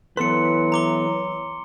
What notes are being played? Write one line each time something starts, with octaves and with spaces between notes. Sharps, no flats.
E3 F#3 B3 A4 B4 C6 C#7
A#5 D6 G7